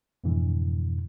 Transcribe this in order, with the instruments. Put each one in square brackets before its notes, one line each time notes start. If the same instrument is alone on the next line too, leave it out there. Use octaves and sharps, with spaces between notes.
[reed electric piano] F2 G#2 B2 D3 E3